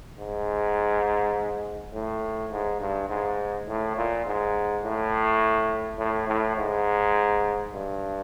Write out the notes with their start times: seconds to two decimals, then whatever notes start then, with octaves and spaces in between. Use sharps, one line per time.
0.19 G#2
1.93 A2
2.51 G#2
2.80 G2
3.09 G#2
3.68 A2
3.97 A#2
4.26 G#2
4.83 A2
5.98 A2
6.28 A2
6.57 G#2
7.73 G2